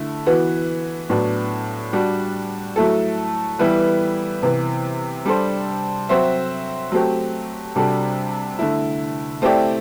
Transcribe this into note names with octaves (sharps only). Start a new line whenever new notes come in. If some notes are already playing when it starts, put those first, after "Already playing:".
Already playing: D3 A3 E4
E3 B3 F#4
A2 F#3 B3 D4
G3 D4 F#4
F#3 A3 E4 A4
E3 G3 B3 E4 B4
C3 E3 B3
G3 D4 A4 C5
F#3 C4 F#4 C5 E5
F#3 A3 C4 G4
C3 G3 D4 F#4 A4
D3 A3 E4
A3 C4 E4 G4 D5